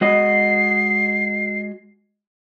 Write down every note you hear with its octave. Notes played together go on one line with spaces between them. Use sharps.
G#3 F#4 D#5 C7